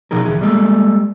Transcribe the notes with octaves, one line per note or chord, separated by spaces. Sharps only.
B2 F3 D#4 G#4 A#4
D2 E3 G#4
G3 G#3 A#3 A4